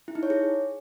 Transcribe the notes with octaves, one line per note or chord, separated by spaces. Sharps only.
E4
D#4
C#5
G#4